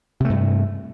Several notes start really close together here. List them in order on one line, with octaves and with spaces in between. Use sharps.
C3 A3 G2